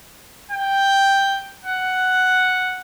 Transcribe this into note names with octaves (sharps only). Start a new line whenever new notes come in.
G5
F#5